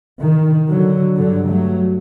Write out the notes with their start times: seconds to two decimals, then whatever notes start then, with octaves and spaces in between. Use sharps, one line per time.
0.21 D#3
0.68 D3 F#3
1.15 G2 D3 F#3
1.47 F#3 A3